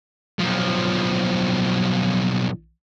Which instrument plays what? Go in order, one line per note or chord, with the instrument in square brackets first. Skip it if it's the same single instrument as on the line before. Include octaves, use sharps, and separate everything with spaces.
[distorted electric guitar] B1 F3